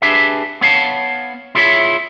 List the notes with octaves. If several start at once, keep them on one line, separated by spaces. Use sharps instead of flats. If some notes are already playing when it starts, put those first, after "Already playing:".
D4 G4 G#4 B4 E5
B3 C#5 F5 A5
E4 F4 G#4 B4 C#5 E5